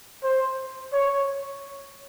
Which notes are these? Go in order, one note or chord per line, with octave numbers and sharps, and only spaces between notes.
C5
C#5